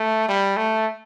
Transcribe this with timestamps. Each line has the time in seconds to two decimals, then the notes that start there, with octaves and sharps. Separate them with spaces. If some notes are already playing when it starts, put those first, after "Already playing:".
Already playing: A3
0.29 G3
0.57 A3